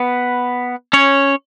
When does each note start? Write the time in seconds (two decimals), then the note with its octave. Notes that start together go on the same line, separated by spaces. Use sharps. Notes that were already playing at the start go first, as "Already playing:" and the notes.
Already playing: B3 B4
0.93 C#4 C#5